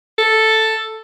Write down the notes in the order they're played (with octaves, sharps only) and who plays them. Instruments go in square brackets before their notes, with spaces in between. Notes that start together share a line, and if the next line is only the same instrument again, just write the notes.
[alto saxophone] A4